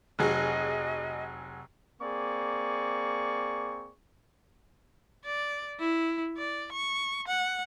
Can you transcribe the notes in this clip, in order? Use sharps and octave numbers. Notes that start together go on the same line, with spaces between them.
F1 F#3 G#4 D#5
A#3 C4 G#4 D5 C#6
D5
E4
D5
C#6
F#5